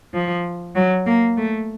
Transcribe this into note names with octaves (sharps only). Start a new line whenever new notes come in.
F3
F#3
A#3
A3